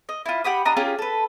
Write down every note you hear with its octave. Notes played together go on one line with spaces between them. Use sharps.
D#5
E4 F4
G4 F#5 B5 D#6
D4 D#5 A#5 D#6
C#4 F4 G4 G#4
A4 B4